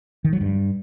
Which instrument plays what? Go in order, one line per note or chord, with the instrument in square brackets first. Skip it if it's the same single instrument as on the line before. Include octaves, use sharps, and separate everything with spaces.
[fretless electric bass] D#3
F#3
G2